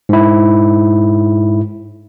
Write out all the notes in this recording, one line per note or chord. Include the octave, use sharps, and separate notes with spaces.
G#2 E4